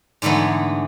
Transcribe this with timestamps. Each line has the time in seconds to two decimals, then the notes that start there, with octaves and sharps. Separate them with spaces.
0.22 G#2 D3 E3 A3 B3